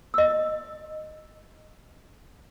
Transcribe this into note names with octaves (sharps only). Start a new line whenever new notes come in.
D#5 E6